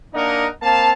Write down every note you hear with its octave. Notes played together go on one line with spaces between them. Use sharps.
A#3 D4 D#4 A#4 D#5 F#5
A#3 C4 F5 A5